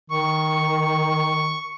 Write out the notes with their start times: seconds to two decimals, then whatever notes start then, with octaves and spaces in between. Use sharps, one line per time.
0.10 D#3 C#6